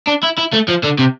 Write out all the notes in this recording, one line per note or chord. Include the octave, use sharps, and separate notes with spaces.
D4
E4
E4
A3
F3
D3
C3